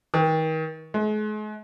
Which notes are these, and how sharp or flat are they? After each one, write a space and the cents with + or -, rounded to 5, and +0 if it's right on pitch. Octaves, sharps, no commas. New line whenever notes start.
D#3 +35
G#3 +45